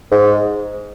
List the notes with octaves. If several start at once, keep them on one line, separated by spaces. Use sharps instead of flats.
G#2